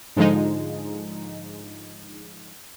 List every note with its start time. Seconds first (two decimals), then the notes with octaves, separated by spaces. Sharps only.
0.16 G#2 D3 F3 G#3 D#4